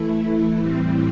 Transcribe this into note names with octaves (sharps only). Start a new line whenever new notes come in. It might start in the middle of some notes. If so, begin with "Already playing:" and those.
Already playing: E3 A3 E4
A2 E3 G3 C4